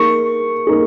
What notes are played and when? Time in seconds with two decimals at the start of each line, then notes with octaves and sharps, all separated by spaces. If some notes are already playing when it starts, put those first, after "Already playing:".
Already playing: A#3 D#4 G#4 C#6
0.67 A#3 D#4 G#4